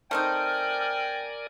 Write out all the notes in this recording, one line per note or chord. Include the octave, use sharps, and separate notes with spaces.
A3 C4 D#4 A#4 D5 G5 G#5 F6